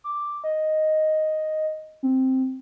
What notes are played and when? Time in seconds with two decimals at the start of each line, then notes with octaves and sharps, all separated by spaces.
0.04 D6
0.44 D#5
2.03 C4